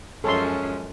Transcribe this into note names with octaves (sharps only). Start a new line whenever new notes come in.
F#2 F3 G#3 C#4 A4 C6